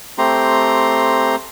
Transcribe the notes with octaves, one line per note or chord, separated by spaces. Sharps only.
A3 C4 G4 A#5 C6